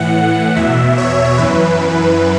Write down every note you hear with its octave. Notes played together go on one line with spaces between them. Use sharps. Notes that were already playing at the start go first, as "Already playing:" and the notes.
Already playing: A2 E3 F#5
E2 B2 E5
C#5
F#2 E3 B4